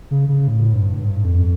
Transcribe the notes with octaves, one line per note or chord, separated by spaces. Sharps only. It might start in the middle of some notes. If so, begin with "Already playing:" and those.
C#3
C#3
A2
G2
A2
G2
F2